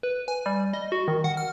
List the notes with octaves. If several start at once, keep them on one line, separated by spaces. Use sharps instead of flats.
B4
G#5
G3
D#5
F#4
D#3
F#5
F6